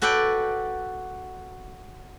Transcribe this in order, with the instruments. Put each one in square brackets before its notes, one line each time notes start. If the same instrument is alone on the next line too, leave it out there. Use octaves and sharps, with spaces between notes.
[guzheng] F#4 A4 B4 D5 G5